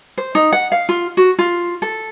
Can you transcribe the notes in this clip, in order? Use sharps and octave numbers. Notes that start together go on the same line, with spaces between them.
C5
D#4
F#5
F5
F4
F#4
F4
A4